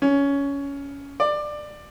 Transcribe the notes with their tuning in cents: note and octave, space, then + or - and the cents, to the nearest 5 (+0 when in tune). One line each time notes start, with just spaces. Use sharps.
C#4 +15
D5 +20